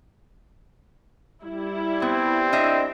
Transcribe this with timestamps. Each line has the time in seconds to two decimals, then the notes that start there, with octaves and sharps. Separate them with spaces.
1.43 G3 E4
2.02 B3 C4
2.53 D4 D#5 E5